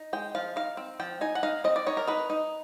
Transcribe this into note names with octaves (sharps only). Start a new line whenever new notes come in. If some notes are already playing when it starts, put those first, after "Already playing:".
Already playing: D#4
G#3 G5
F3 F5
D#4 F5
C4
F3 G5
D#4 G#5
F#5
D#4 F5
C4 D#5
D5
D#4 C#5
A#4
D#4 B4
D#4